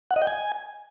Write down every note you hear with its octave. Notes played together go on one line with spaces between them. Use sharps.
F#5
D#5
G5
G#5